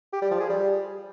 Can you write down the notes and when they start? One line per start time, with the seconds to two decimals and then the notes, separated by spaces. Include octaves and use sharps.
0.13 G4
0.22 G3
0.31 F3
0.40 G#4
0.49 G3